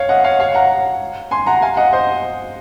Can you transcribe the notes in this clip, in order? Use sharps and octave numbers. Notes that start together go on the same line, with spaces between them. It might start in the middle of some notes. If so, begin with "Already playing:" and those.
Already playing: C#5 F5
D#5 F#5
C#5 F5
C#5 F5
F#5 A#5
G#5 C6
F#5 A#5
F5 G#5
D#5 F#5
C5 D#5